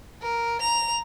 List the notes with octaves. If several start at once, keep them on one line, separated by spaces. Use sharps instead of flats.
A#4
A#5 F7